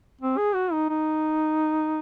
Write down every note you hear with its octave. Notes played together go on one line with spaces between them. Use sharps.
C4
G#4
F#4
D#4
D#4